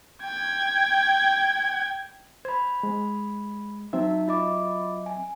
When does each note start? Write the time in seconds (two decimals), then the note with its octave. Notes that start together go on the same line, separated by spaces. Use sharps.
0.23 G5 G#6
2.45 C5 B5 G#6
2.83 G#3
3.93 F#3 C4 D#4 E5
4.28 F4 D#5 D6
5.06 G#5